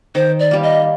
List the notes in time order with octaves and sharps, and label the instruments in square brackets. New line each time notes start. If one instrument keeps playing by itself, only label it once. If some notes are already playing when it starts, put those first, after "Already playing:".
[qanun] D#3 [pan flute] C5
[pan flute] D5
[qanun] G3 A#3
[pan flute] D#5